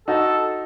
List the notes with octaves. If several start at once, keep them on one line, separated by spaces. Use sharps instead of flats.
D#4 F#4 A4